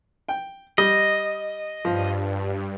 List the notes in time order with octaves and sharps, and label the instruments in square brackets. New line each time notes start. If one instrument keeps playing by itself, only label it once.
[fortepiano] G5
[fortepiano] G3 [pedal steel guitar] D#5
[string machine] G2 [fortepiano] F3